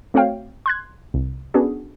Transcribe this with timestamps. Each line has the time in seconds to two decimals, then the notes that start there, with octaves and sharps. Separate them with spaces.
0.14 A3 C4 F#4 C#5 F5 G5
0.66 C6 F#6 G#6
1.14 C2
1.54 B3 C#4 D4 F#4 G#4 A4